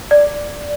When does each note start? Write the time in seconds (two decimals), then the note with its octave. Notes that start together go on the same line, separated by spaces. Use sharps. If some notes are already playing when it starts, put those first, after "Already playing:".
0.11 D5